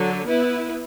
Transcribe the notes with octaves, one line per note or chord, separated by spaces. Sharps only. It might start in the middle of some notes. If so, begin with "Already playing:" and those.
Already playing: D3 F#3
B3 E4 B4